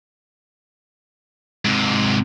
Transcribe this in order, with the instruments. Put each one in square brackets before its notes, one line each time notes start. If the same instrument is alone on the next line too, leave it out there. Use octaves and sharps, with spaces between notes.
[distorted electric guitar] G#2 C3